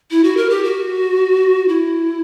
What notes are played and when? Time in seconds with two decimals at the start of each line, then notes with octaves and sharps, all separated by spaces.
0.11 E4
0.24 F#4
0.37 A#4
0.50 G4
0.64 F#4
1.68 E4